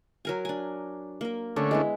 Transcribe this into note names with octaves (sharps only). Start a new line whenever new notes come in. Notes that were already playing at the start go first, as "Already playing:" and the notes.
F#3 A#4 G#5
D4 G#5
A#3 A#4
D3 A3 C#4 D4
G#3 B3 E4